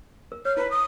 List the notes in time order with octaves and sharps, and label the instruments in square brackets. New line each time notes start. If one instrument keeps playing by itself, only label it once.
[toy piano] A#4
[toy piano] C#5 [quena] F6
[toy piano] E4 A#5 [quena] B4
[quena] D#6